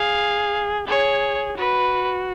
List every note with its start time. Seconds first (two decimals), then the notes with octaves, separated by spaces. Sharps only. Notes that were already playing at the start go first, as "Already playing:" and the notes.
Already playing: G#4 F5
0.88 G#4 C#5
1.57 F#4 B4